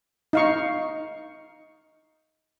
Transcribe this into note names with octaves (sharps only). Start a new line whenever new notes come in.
D#4 F5 C#6